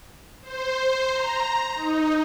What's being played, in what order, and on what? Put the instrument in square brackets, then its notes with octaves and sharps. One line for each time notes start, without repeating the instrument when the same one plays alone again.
[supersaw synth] C5
A#5
D#4